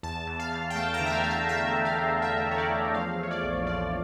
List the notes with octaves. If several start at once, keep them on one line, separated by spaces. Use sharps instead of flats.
E2 A5
E2
F5
E2
G5
A3 A5
A#5
D3
E5
F5
A3 F5
E5
A3 E5
E2
F5
D3
E2 E5
D3 C#5
D5
E2
F3 F5
A3 C#5
D5
A#1
F3 D5